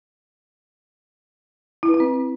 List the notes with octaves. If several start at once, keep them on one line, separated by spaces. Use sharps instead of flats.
E4
B4
E4
C4